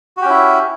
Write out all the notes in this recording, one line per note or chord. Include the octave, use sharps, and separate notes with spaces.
C#4 E4 F#4 G4